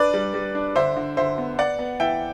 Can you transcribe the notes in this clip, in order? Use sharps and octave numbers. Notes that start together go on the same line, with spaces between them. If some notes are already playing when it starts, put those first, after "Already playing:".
Already playing: D4 B4 D5
G3
G3
D4
D3 C5 E5
D3
D3 C5 E5
B3
B3 D5 F#5
B3
E3 E5 G5